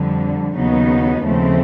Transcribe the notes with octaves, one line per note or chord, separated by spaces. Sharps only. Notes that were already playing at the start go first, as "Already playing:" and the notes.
Already playing: F2 D3 G3
D#2 C#3 F#3 B3 D#4
D#2 C#3 F3 A3 C4